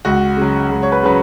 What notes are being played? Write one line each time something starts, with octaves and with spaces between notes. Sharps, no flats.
C#2 F#4
C#3 F#3
C#2
C#5
B4
C#3 F#3 B4